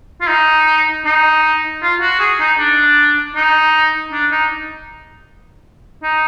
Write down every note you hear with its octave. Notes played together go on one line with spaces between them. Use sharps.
F4
D#4
D#4
F4
F#4
G#4
D#4
D4
D#4
D4
D#4
D#4